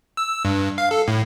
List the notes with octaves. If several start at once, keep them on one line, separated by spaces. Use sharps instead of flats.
E6
G2
F5
A4
A2